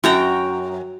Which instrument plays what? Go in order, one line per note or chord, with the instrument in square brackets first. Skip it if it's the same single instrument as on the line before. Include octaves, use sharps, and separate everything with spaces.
[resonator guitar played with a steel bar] F#2 [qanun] F#4 G5 A#5